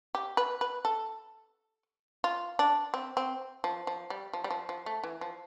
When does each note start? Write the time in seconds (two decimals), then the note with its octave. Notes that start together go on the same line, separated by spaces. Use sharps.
0.15 G4
0.37 B4
0.61 B4
0.85 A4
2.24 F4
2.59 D4
2.94 C4
3.17 C4
3.64 F3
3.87 F3
4.10 G3
4.33 F3
4.44 G3
4.51 F3
4.69 F3
4.86 A3
5.04 E3
5.21 F3